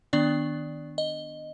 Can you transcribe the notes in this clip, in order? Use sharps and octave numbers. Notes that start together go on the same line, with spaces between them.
D#3 B3 D4 D5
D#5